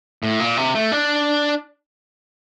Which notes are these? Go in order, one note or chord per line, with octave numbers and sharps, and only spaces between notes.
A2
A#2
C3
A3
D4